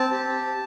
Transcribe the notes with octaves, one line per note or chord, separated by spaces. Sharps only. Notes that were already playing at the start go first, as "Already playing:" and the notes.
Already playing: C4 A5
G4